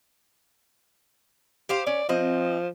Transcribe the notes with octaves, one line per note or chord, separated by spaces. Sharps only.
G4 C5 F5
C#4 D5
F3 C4 D#5